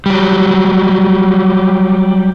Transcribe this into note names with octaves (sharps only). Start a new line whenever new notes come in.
F#3 G3